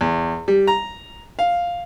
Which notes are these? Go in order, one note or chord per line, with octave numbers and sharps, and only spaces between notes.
E2
G3
A#5
F5